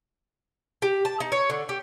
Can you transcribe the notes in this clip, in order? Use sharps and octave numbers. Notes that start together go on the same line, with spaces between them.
G4
A5
D#4
C#5
D3
G4